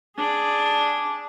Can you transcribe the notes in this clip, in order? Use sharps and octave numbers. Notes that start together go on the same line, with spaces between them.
D4 G#4